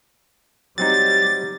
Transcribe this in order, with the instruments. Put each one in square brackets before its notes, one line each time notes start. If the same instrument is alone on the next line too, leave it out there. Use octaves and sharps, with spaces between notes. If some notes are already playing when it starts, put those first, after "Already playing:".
[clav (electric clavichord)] F#3 C4 D#4 [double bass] G3 [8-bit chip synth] A6